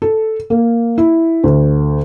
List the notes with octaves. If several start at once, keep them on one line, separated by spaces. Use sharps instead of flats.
A4
A#3
E4
D2